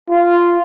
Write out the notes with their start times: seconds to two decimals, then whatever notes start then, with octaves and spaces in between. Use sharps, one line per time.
0.10 F4